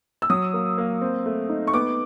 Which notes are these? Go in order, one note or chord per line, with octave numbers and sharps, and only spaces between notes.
E6
F#3 D#6
A#3
A#3
C4
A3
D#4
C#6
B3 D6